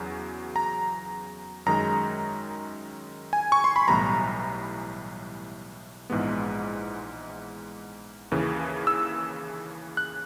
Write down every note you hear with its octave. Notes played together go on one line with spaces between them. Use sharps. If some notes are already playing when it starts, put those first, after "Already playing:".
Already playing: E2 C#3 F#3
A#5
F#2 D#3 G#3 A#5
G#5
C#6
C6
B5
B1 A2 E3 G3 B3 A#5
A#1 G#2 E3 G#3 B3
D#2 C#3 E3
E6
F#6